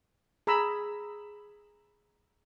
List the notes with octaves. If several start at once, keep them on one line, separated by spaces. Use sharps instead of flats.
G#4 A#5 B5 E6